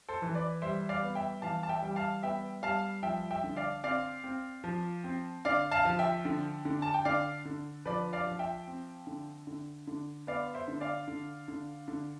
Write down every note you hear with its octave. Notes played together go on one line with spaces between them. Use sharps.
A4 C5
E3
B4 D5
G3 C5 E5
D5 F5
B3
E5 G5
E3 F5 A5
A5
E5 G5
G3 G5
F5 A5
B3 E5 G5
G3 F5 A5
F3 E5 G5
E5 G5
D3
D5 F5
C4 D5 F5
C4
F3
C4
D3 D5 F5
F5 A5
F3
E5 G5
D3
D3
A5
G5
D3 D5 F5
D3
F3 B4 D5
D5 F5
F3
E5 G5
C4
D3
D3
D3
B3 D5 F5
C5 E5
D3
D5 F5
D3
D3
D3